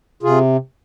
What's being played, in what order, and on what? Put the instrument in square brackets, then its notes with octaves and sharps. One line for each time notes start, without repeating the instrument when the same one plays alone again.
[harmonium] C3 F4 G#4